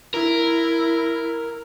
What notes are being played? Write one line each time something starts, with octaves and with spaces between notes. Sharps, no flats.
E4 A#4